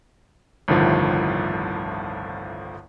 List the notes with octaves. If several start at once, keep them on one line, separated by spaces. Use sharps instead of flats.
G1 C2 A2 D3 D#3 F3